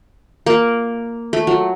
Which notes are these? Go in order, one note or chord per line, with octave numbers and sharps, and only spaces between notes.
A#3
A3
F#3